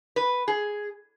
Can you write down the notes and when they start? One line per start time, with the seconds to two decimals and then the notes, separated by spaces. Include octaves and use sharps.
0.16 B4
0.48 G#4